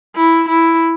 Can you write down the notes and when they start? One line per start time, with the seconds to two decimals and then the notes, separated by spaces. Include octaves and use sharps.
0.16 E4
0.49 E4